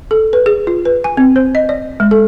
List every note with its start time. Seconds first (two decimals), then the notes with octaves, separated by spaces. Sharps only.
0.11 A4
0.33 B4
0.46 G#4
0.67 F4
0.85 B4
1.04 G#5
1.17 C4
1.36 C5
1.55 D#5
1.69 D5
2.00 G#3
2.11 A4